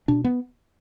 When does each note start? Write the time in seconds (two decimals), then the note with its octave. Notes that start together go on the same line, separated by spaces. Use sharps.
0.08 B2 D4
0.24 B3